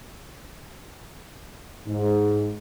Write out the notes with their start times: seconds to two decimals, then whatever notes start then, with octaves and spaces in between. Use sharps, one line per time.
1.87 G#2